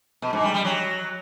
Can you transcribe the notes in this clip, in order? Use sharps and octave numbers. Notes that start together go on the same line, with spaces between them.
B2
G#2
G3
G3
F#3